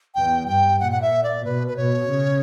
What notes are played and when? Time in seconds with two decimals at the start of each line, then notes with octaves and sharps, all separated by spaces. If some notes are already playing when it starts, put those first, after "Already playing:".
0.15 E2 G5
0.47 G2 G5
0.80 A#2 F#5
0.92 F#5
1.01 E5
1.23 D5
1.44 B2 B4
1.67 B4
1.76 B2 C#5
2.09 C#3